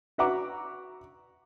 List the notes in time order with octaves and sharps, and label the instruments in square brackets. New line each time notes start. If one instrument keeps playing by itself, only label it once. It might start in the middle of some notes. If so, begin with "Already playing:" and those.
[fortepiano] F#4 B4 E5 F#5 A#5 D6